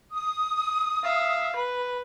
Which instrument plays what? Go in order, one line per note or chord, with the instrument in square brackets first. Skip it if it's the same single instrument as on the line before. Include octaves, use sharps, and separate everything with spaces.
[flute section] D#6
[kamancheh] E5 F5
B4